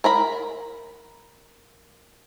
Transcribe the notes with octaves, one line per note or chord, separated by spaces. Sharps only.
A#4 A#5 B5